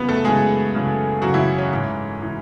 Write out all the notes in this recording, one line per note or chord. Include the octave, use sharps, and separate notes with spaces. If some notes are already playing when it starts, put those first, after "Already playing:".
Already playing: F#2 C#3 E3 B3 B4
A3 A4
F#2 C#3 E3 G#3 G#4
F#2 C#3 E3
F#2 C#3 E3 F#3 F#4
E3 E4
C#4
G#2 E3
E3